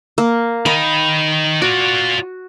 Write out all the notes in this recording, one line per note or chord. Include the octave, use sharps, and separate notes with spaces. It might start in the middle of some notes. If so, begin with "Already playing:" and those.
A#3
D#3 D#4 B5
F4 F#4 D5